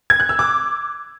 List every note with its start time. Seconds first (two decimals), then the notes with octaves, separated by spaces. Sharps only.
0.10 G#6
0.20 F#6
0.29 E6
0.39 D6